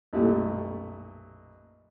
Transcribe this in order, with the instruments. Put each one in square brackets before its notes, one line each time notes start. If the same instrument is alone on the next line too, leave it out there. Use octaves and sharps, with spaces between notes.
[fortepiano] B1 F#2 A#2 G3 A3